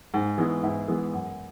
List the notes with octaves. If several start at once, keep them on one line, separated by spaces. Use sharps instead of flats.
G#2
E3 G#3 B3
G#2 E4
E3 G#3 B3
F#2